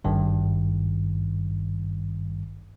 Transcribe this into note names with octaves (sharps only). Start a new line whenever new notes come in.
G#1 G2 D#3